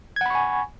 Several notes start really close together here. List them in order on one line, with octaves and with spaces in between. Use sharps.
G#6 F#5 B5 C#6 G#5